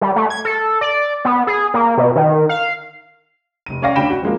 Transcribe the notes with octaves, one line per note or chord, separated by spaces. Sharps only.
G3
A3
G#6
A4
D5
B3
G#4
A#3
B2
D#3
F5
F1 D#7
C#4 C#5 D5 F5 G5 A#6
D2 C#4 D4 G5 B5 E7
F#4
F3 G#3 A#3